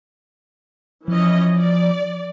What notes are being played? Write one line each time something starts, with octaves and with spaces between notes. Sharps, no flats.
E3 F3 C#4 D#5
D5